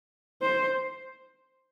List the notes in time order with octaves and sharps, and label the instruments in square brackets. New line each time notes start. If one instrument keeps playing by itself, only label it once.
[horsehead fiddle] C5